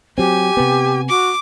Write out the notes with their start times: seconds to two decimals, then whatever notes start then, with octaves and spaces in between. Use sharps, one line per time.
0.18 F#3 C4 G4 G#5
0.57 C3 B3
1.09 F#4 D6